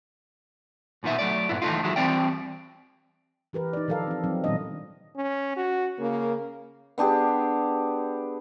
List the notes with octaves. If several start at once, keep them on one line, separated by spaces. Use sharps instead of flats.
B1 A#2 D#3 B3 E5
F#3 A3 D5
G2 A#2 B3 E4
D#3 E3 F#3 A3 D#4 F4
D#3 F#3 G#3 E4
E3 G3 C4 D5 G5
E3 G4 A#4 B4
D#4 D5
D#3 F3 A4 A#4 F5
C4 A4
F3 F#3 C4 D#4
A#2 D#3 G3 B3 D4 D#5
C#4
F#4
C#3 A#3
B3 D4 G4 G#4